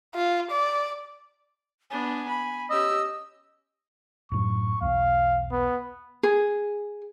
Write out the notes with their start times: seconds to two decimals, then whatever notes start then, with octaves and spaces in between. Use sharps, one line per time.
0.15 F4
0.51 D5
1.90 B3 D4 G#5
2.28 B5
2.70 C#4 G4 D#5 E6
4.32 F#2 A2 F#3 C#6
4.81 B1 E2 F5
5.52 B3
6.23 G#4